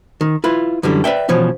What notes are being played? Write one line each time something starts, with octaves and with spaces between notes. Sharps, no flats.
D#3
E4 F4 B4
F#2 D3 E3 G3
B4 D5 E5 G5
B2 E3 F3 C#4